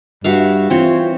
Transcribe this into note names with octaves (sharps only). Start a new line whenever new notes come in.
G2 F#4 E5 F5
E3 C4 F4 C#5